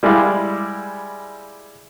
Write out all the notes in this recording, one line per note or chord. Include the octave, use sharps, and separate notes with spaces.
G3 G#3 E4 D5 F5